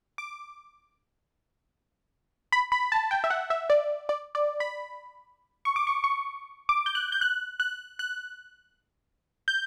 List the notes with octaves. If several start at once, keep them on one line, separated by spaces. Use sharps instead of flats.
D6
B5
B5
A5
G5
E5
F#5
E5
D5
D5
D5
B5
C#6
D6
C#6
C#6
D6
G6
F#6
G6
F#6
F#6
F#6
G6